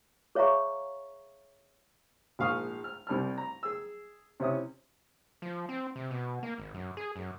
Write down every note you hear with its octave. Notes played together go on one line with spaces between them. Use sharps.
G#4 C#5 E5 F5 A#5 C#6
A#1 G#2 F5 C#6 D#6 F6
F6
C2 G3 A5 F6
A#5
G#4 E6
C3 C#4 E4 D#6
F3
C4
C3
B2
A#3
G#1
F#2
G#4
F#2